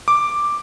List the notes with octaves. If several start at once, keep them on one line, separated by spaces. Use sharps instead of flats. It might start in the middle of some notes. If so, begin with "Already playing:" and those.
D6